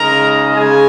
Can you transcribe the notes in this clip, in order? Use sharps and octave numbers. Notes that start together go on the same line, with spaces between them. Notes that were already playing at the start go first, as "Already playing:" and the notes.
Already playing: C#3 G#3 D#4 A#4 A#5
C#3 G#3 G#4 G#5